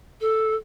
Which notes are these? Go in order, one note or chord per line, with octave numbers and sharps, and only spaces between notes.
A4